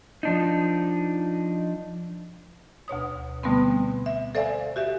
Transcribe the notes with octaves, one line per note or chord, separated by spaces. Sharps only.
F3 D4 D#4
D2 B2 C#5 D#6
B2 D3 G3 A3 B3 C4
E5
A4 C5 D5 E5 F5 G#5
F#4 G4 E5